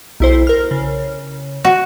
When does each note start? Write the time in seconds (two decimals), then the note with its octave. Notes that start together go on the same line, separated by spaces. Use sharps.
0.20 B1 E4 C5
0.47 A#4 F6
0.71 C#3
1.65 F#4